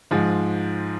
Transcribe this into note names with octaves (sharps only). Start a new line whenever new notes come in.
G#2 F3 G#3